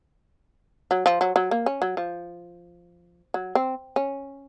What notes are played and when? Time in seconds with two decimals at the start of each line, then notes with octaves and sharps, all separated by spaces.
0.91 F#3
1.06 F3
1.21 F#3
1.36 F#3
1.51 A#3
1.66 C#4
1.82 F#3
1.97 F3
3.34 F#3
3.55 C4
3.96 C#4